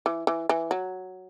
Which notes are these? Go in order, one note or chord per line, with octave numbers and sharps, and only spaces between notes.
E3
E3
E3
F#3